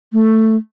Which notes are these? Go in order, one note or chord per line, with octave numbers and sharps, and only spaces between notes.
A3